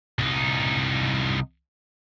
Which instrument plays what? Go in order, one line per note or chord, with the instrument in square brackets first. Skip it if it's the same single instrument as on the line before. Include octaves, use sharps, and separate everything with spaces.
[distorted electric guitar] C2 D#4